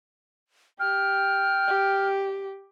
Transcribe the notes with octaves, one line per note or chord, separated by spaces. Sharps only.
G4 G5 F6
G4